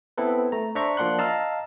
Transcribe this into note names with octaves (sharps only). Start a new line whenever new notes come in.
B3 C4 E4 A4 B4
A3 A#5
D4 C5 E5 A#5 C#6
F3 A#3 D4 F#5 C6 F#6
D#5 F5 A5 A#5 E6 F6